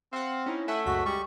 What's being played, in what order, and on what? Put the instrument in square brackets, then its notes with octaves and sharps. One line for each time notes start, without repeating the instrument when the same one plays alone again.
[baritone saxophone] C4 [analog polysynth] F5 F#5
[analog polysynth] C#4 D#4 E4
[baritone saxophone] A3 [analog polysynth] E5 F#5 G#5
[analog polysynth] C#2 F#2 B6 [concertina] F#4
[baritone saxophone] G3 [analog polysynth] G#3 [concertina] C#6